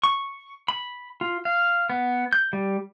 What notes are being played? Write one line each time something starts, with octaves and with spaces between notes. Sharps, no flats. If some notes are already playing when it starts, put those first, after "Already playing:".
C#6
B5
F4
F5
B3
G6
G3